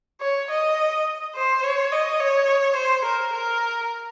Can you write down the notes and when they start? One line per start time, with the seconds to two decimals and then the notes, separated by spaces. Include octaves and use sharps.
0.21 C#5
0.50 D#5
1.35 C5
1.64 C#5
1.92 D#5
2.20 C#5
2.76 C5
3.05 A#4
3.33 A#4